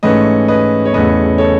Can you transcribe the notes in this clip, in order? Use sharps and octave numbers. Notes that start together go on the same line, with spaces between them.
G#2 E3 A3 C#4 B4 D#5
B4 D#5
C#5
E2 C#3 E3 A3 C#4 B4 D#5
A4 C#5